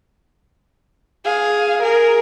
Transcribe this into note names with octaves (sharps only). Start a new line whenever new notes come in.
G#4 F5
G#4 A#4